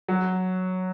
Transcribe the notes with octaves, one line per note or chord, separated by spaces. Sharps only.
F#3